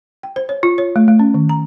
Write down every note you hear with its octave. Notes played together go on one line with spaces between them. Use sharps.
G5
C5
C#5
F4
C#5
A3
A3
C#4
D#3
A#5